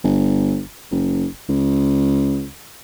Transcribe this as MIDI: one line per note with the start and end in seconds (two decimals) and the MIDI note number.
0.04 0.61 31
0.91 1.26 30
1.49 2.46 37